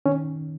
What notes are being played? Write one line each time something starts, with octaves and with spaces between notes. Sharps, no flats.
D#3 C#4